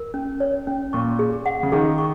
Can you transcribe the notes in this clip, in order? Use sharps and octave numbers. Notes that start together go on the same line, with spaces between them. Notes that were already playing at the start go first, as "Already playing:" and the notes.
Already playing: A#4
C#4
C#5
C#4
A#2 C#6
G#4
F#5
C#3
D#3 G#4
C#6